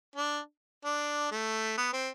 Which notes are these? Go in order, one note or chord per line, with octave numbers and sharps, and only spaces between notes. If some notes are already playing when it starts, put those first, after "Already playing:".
D4
D4
A3
B3
C4